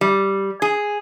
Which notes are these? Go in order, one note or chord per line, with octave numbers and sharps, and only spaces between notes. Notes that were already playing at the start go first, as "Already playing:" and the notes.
G3
G#4